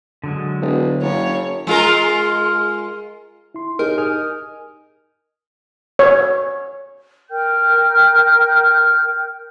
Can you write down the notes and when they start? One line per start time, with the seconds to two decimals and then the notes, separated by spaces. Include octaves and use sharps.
0.24 D3 F#3 G#3
0.61 E1
1.02 F#1 C#5
1.67 G#3 F4 A#4
3.54 E4 C6
3.79 D#4 G4 G#4 A#4
3.98 G#5 D#6 F6
5.99 C#5
7.29 A#4 G5 F6 G6